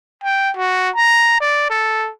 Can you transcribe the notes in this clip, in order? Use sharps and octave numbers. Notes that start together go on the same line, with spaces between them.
G5
F#4
A#5
D5
A4